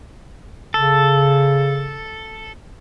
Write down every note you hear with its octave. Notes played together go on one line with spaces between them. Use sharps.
C#3 A4